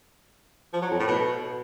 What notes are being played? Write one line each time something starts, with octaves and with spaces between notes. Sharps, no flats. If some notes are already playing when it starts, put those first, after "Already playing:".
F3
F#3
F2
A2
B2